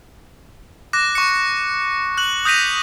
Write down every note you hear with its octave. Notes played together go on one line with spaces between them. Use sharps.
D6 F#6 A#6
C#6 C#7
F#6 F#7
D#6 G6 A#6 B6 D#7 F7